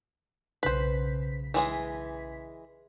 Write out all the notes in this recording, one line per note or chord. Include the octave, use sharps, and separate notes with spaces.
B1 C#3 B4 C5 B6
E3 G#3 G#4